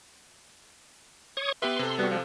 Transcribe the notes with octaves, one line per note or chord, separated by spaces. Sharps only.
C#5 C#6 D#6
B3 G4 B4 E5 C6
C3 A4
G3 B3 F#4
F3